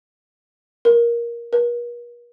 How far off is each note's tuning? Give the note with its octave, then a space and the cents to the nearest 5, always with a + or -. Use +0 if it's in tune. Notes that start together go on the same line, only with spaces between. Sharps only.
A#4 +15
A#4 +45